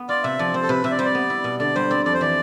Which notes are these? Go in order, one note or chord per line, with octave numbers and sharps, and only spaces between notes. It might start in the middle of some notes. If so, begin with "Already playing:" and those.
Already playing: B3
F4 D5
C3 E5
F3 D5
C4 C5
A4
C3 B4
C3 E5
D5
G3 C5
D5
B3
E4
B2
D3 D5
G3 C5
C4 D5
F2 D5
C5
E3 D5